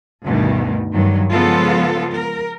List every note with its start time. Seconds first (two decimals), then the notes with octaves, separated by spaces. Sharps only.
0.23 D2 G2 B2 D#3
0.92 G2 D#3 F#3
1.30 C#3 F3 G#3 B3 F4 A4
2.13 A#4